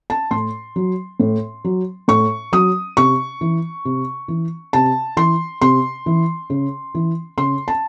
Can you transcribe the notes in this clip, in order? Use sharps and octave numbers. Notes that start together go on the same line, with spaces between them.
A5
A2 C6
F#3
A2
F#3
A2 C#6
F#3 D#6
C3 C#6
E3
C3
E3
C3 A5
E3 C6
C3 C6
E3
C#3
E3
C#3 C6
A5